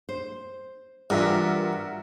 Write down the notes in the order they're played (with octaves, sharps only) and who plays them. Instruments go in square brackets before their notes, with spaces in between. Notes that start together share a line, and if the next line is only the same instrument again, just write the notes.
[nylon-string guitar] C5
[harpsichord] G2 [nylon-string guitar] E3 F4 G#5 [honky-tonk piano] F#4 A#4 E5